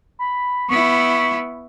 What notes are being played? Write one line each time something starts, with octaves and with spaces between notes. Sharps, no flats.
B5
B3 E4 C#6